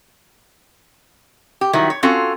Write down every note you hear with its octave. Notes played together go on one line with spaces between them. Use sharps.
G4
D#3 F#3 G3 E4
C#5
C4 C#4 F4 F#4 A4